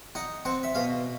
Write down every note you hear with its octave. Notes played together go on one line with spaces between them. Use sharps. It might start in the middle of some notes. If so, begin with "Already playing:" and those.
D#4 F#5
C4 F#5
E5
B2 F5